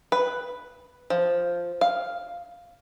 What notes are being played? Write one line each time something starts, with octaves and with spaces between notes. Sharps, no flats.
B4
F3
F5